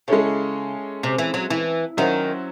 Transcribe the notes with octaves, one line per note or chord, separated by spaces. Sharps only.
C#3 G#3 C#4 E4 A4 C#5
C3
E3
F#3
E3
D#3 F#3 C#4 F#4 C5 E5